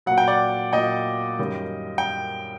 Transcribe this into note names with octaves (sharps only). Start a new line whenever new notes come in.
A#2 F#3 F#5
G5
D5 F#5
A#2 F#3 D#5 G5
F#2 D#3 G3
G5